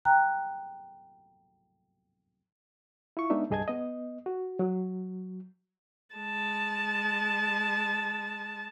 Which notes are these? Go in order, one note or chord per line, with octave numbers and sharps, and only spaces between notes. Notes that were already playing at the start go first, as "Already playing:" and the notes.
G5 A#5 F#6
E4 F4 C#6
G#3 B3 D4 D#4 E5
C2 G2 G#4 D#5 A5 G#6
B3 D#5
F#4
F#3
G#3 A5